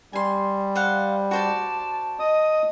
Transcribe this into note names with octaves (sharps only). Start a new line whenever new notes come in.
G3 G#5 C6
C5 F5 F#5
F#4 C5 D5 A5
D#5 D#6